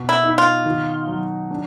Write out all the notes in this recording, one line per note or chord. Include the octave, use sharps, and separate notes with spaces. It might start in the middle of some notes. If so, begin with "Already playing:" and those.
Already playing: B2
E4
D#4
F4
D#3
F#3
D4